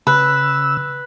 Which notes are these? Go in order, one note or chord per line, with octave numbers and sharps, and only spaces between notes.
C#3 B4 E6